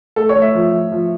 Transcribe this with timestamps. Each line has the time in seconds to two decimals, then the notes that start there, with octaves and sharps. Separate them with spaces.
0.16 A3 A4
0.29 C#5
0.36 A3
0.42 E5
0.54 F3
0.73 F3
0.92 F3